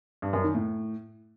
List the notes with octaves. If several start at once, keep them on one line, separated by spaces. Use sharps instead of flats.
G2
F#2
D#3
A2